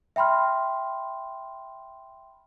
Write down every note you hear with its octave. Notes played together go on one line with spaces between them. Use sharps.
E5 G5 B5 C6 F6